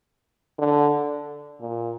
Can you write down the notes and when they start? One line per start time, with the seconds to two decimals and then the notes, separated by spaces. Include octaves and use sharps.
0.59 D3
1.60 A#2